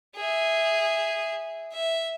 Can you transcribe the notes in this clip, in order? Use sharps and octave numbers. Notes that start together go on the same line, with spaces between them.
G#4 E5
E5